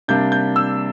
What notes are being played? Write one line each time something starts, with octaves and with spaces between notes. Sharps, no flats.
C3 G3 A#3 D4 G6
G6
E6